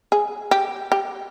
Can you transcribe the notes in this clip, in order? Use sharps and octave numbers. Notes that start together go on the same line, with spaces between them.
G#4
G4
G4